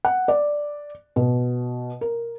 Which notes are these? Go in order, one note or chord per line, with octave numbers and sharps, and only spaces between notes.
F#5
D5
B2
A#4